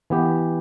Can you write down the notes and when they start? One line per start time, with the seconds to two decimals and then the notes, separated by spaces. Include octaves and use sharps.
0.10 E3 B3 G4